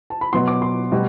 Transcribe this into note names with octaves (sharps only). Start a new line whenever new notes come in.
A5
B5
B2 F#3 B3 C6
D6
C6
B2 G3